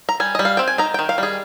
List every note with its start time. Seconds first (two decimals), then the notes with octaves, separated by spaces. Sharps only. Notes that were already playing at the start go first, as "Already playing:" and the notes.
0.09 A#5
0.20 G3 G#5
0.35 G3 D#5
0.45 F5
0.57 C4 G5
0.68 G#5
0.78 D#4 A#5
0.94 D#3 G5
1.09 F5
1.18 G3 G#4